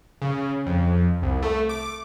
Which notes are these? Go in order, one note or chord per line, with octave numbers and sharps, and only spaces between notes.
C#3
F2
C2
A3
D6